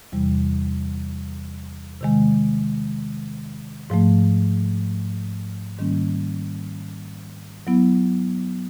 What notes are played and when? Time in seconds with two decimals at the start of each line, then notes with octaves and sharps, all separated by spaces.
0.12 E2 C3 E3 G3
2.01 C3 D#3 G#3
3.90 G#2 F3 A3
5.78 G#2 D#3 G3 A#3 C#4
7.67 F#3 B3 E4